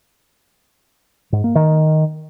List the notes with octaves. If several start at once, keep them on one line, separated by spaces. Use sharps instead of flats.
G#2
A#3
D#3